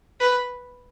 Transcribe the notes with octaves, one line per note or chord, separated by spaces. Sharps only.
B4